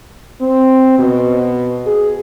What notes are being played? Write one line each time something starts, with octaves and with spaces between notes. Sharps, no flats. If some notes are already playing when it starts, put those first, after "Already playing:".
C4
B2
G#4